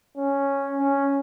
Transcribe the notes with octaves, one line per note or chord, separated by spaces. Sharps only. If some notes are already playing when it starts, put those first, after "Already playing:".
C#4
C#4